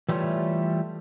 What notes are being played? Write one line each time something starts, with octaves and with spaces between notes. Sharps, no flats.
E3 G3 A3 F4 C#5